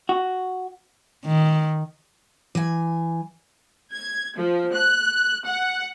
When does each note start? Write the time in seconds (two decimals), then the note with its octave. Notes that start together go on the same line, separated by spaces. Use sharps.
0.09 F#4
1.25 D#3
2.55 E3 G#5
3.93 G#6
4.37 F3
4.74 F#6
5.46 F#5